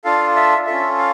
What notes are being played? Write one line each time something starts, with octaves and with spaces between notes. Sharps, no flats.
D4 F4 A4 F5
E5
C#4 F4 A4 E5
F5